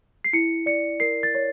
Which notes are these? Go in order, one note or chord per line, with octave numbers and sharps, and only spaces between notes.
C7
E4 C#7
D5 C#7
A#4 C7
A6
C#5